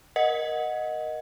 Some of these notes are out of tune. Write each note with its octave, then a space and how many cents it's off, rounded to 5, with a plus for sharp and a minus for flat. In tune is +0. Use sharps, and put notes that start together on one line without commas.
A#4 +15 D#5 +0 F#5 -10